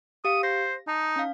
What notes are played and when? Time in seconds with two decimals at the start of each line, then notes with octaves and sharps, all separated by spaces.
0.25 G4 F5 D#6 C#7
0.43 C5 A#6
0.87 D#4 A5
1.16 C#4 F5